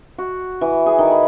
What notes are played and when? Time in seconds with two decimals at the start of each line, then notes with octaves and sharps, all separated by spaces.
0.18 F#4
0.61 E3
0.86 G#4
0.99 D#3
1.11 B5